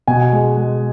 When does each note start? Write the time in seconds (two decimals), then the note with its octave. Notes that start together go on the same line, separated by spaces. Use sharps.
0.08 B2 G#5
0.32 G#3
0.57 G#3